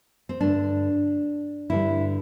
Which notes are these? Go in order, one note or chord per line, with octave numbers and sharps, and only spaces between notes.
C4
G2 D3 A3 D4
G2 D3 G3 E4